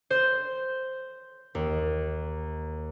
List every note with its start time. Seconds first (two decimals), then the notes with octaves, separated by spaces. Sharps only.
0.10 C5
1.55 D#2